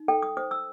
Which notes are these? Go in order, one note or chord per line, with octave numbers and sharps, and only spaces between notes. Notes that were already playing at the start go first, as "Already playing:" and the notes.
Already playing: D#4
A4 G5
D#6
C5 D#6
E6